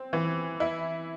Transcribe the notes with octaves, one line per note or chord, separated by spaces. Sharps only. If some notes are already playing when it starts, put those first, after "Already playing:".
Already playing: C4
E3
E4